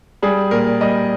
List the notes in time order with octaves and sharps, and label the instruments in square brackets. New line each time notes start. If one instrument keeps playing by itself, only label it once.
[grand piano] G3 G#4
A#2 A#4
G3 D#5